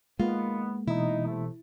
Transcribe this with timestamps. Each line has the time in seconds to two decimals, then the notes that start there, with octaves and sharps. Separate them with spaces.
0.20 D#3 G#3 A#3 B3 F4
0.88 B2 E3 D#4 E4
1.26 C3 A3